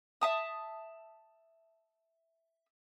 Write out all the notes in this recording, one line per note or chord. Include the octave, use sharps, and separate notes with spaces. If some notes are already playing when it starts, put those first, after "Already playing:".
E5 A5 D#6